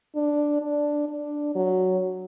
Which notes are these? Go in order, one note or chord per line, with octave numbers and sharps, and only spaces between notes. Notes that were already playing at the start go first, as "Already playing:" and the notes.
D4
D4
D4
F#3